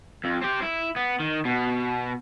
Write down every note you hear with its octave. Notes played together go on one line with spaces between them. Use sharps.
F2
C4 G4
E4
B3
D#3
B2